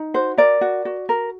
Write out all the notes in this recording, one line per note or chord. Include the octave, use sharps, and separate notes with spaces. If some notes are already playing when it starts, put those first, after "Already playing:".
Already playing: D#4
F#4 C5
A#4 D5
F#4
F#4
A#4